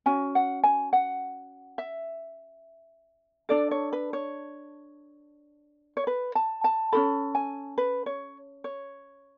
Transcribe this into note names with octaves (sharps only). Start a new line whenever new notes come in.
C#4 F#4 G#5
F#5
G#5
F#5
E5
D4 A4 D5
C#5
B4
C#5
C#5
B4
A5
A5
C#4 F#4 A4 B5
G#5
B4
C#5
C#5